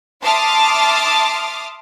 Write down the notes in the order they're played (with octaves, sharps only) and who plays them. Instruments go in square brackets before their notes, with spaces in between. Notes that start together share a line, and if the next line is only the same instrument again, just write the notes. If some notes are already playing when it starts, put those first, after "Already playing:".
[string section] E5 A5 C6 D6 D#6 F6